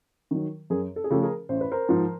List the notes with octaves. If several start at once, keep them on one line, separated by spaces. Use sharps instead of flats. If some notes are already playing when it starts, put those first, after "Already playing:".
D#3 F#3
F#2 G#4 A#4
A4
G#4
C#3 F3 A3 G4 A4
G#4 A#4
A1 C5
B4
A#4 C5
G#2 F3